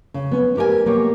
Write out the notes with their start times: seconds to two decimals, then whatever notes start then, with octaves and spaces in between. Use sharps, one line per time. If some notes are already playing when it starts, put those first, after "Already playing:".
0.14 C#3
0.31 B3 C#4
0.57 G4 A#4 D5 G5 G#5
0.85 B2 A#3 G4 C#5